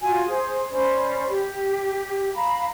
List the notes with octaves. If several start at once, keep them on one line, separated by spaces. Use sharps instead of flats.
F4 F#4 G#5
G#4 C5
C#4 C5 D5 B5
G4
F5 A#5 B5